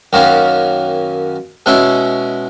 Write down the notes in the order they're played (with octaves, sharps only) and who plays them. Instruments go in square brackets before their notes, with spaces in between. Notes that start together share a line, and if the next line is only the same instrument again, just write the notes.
[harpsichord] F#2 D#3 F#3 A#3 C#4
B2 G#3 C#4 E4